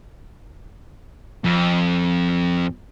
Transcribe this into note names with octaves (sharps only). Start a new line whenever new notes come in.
F2